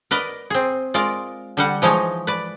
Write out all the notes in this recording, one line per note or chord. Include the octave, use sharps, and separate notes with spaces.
A#4 B4 D5 D#5
C4 G#4
G#3 F4 A#4 D5
D3 G3 F#5
E3 F3 G#3 D#4 C#5
B4 D5